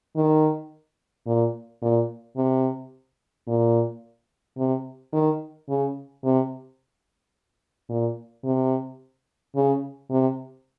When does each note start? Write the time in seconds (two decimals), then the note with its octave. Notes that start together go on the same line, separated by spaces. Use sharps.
0.16 D#3
1.26 A#2
1.82 A#2
2.36 C3
3.47 A#2
4.57 C3
5.12 D#3
5.68 C#3
6.23 C3
7.89 A#2
8.44 C3
9.55 C#3
10.10 C3